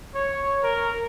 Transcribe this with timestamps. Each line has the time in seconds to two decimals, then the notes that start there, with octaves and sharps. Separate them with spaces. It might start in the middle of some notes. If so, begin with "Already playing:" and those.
0.15 C#5
0.64 A#4